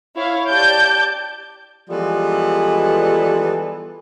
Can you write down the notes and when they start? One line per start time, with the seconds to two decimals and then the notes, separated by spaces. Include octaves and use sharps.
0.16 E4 C#5 F5
0.49 G4 D5 A5 G6 D7
1.90 E3 F3 G3 G#3 B3 A4